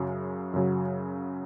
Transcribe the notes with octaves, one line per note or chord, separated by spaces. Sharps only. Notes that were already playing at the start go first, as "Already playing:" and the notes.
Already playing: F#2 C#3 F#3
F#2 C#3 F#3